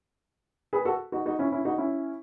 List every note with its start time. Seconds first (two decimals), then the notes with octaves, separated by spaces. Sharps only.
0.73 G#4 B4
0.85 F#4 A4
1.12 D#4 F#4
1.26 D#4 F#4
1.39 C#4 E4
1.52 C#4 E4
1.65 D#4 F#4
1.78 C#4 E4